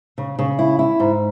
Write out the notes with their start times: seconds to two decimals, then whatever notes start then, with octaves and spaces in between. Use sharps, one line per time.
0.18 C#3
0.39 C#3
0.59 E4
0.79 E4
1.00 G#2